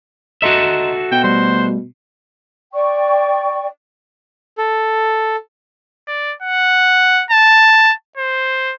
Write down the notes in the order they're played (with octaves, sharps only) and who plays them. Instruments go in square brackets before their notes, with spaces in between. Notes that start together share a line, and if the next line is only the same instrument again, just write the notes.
[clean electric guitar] F#4 A4 E5 [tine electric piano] D#5 A#5 C6
[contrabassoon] B2 [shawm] G5
[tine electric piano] G3 A3 [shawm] C5
[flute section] D5 G5 C#6
[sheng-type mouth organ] A4
[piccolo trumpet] D5
F#5
A5
C5